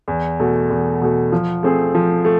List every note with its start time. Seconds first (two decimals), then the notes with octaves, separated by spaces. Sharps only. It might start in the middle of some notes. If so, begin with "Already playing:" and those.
0.08 E2
0.40 B2 A3
0.70 E2
1.02 B2 A3
1.32 F3
1.63 A3 C4 G#4
1.95 F3
2.25 A3